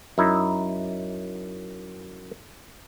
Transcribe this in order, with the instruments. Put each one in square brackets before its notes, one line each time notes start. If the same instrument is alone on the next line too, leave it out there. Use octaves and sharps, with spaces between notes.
[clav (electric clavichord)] F#2 D#4 E4